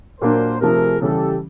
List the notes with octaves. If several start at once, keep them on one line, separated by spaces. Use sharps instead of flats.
A#2 F#3 A#3 D4 A#4 C5
C3 F3 A3 G#4 A#4
C#3 E3 G3 G4 A4